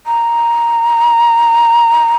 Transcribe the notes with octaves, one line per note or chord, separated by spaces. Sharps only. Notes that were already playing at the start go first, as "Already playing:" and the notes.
A#5